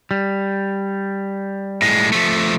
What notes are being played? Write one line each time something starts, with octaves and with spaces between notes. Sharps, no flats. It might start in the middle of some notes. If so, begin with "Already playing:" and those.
G3
A2 G#3
F3 A3